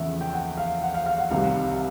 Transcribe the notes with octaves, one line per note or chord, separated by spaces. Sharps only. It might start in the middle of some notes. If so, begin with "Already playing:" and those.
Already playing: E2 C#3 F3 A3 E5
G5
F#5
F5
F#5
F5
F5
F#5
C2 C3 D#3 G3 F5